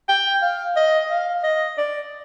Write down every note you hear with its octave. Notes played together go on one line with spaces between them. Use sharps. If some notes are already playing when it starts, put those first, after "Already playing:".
G5
F5
D#5
F5
D#5
D5